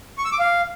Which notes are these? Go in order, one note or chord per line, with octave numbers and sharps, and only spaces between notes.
C#6
E6
D6
F5